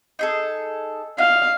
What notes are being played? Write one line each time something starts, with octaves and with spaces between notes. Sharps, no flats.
D#4 G#4 A4
D#5 F5